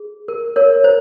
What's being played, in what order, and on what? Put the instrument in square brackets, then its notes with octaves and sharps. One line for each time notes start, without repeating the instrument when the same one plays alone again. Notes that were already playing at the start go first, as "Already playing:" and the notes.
Already playing: [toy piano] G#4
A#4
A#4 C#5
C5